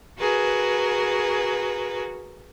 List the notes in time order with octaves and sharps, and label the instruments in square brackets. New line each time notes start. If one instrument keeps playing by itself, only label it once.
[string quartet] F#4 G#4 A#4 B4